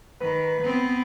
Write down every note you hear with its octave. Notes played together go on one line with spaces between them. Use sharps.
D#3 B4
B3 C4